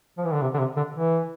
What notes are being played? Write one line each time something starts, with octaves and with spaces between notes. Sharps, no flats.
F3
E3
D3
C3
D3
C3
D3
E3